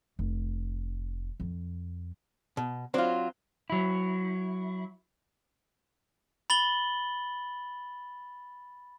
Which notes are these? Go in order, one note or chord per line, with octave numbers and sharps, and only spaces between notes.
F1
F2
B2
F#3 C4 F4 C5 D5
F#3 E4
B5 A6 F#7 G7